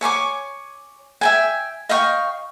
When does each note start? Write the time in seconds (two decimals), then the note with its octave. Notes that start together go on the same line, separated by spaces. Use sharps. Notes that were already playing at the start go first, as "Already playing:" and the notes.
0.01 C#5 G#5 C#6 D6
1.21 E5 G5 G#5
1.89 D#5 F5 G5 C#6